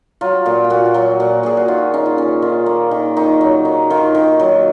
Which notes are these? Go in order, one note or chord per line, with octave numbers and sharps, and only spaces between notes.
F#3 F4
A#2 F4
F4
A#2 F#4
F4
F#3 F#4
A#2
A#2 G#4
F#4
D#3 F4
C#4 D#4
F4
C#4
D#3 F4
A#3
D#3
D#3 D#4
F#3
D#3
D#3 F4
D#3
F#3